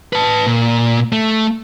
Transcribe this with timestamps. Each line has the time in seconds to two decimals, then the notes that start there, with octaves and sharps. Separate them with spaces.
0.13 B4 A5
0.46 A#2
1.12 A3